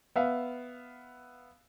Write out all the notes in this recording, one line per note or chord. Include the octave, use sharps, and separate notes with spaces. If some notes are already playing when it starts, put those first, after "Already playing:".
B3 E5 F5